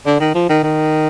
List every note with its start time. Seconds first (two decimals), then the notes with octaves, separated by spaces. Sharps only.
0.06 D3
0.20 D#3
0.35 F3
0.49 D#3
0.63 D#3